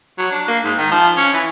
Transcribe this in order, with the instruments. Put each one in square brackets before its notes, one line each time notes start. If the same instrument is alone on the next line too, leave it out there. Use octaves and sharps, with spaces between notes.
[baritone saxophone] F#3
D4
A#3
G#2
D#3
F3
C#4
E3